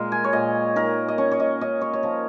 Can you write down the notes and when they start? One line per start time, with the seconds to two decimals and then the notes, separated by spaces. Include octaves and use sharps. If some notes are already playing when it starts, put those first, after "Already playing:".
Already playing: A#2 G#3 A#4
0.12 G#5
0.24 C#5
0.33 A#2 D#5
0.76 D#4 A#4
1.08 D#5
1.18 C#4 C#5
1.32 C#5
1.40 D#5
1.61 C#4 D#5
1.81 C#5
1.93 C#5
2.03 F3 A#4